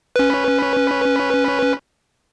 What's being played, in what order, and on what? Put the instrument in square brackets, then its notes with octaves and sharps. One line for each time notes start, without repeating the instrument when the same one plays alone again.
[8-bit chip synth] C#4 B4